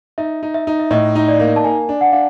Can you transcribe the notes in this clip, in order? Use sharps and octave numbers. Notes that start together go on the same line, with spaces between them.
D#4 E5
D#4
E5
D#4
E5
A2 D#5
D#4
D5
A#3
A5
A#3 G#5
D4
F#5
D4 F5